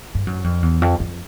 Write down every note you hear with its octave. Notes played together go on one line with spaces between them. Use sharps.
G2
F#2
F2
E2
F2
F2